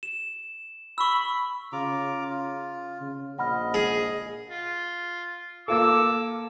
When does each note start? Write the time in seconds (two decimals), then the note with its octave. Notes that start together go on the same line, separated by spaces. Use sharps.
0.03 E7
0.98 B5 C#6 E6
1.72 C#3 F4 A#5 D6
2.30 F4
3.00 C#3
3.39 A#1 D#5 F#5 B5 F6
3.74 G#4
4.50 F4
5.68 A#3 F4 A4 D6 E6